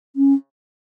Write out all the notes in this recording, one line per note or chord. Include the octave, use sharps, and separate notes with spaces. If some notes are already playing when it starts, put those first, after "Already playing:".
C#4